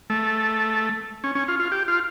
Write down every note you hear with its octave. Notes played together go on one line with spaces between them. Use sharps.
A3
C#4
C#4
F4
F4
G4
F4